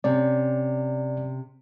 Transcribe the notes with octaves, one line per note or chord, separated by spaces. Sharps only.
C3 C#4 D5